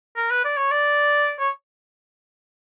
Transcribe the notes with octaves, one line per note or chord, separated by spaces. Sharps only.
A#4
B4
D5
C#5
D5
C#5